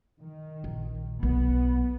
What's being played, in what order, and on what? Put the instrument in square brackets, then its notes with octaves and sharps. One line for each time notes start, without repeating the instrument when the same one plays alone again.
[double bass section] D#3
[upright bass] A#1
[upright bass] B1 [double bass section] B3